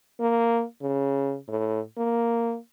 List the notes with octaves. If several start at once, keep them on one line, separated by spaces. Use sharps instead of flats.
A#3
C#3
A2
A#3